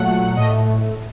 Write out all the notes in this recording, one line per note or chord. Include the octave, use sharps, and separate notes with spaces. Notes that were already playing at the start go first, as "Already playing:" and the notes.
Already playing: A#2 F#3 A3 F#5
A2 A3 D#5